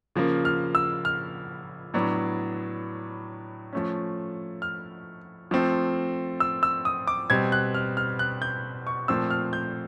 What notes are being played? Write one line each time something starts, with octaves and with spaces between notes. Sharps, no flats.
C#3 F3 A#3
F6
E6
F6
A2 F#3 B3 D4
F3 A3 C#4
F6
F3 A3 C4
E6
E6
D#6
D6
B2 G3 C4 G#6
F#6
F6
F6
F#6
G6
C#6
A#2 F3 A3 C4 E6
F6
G6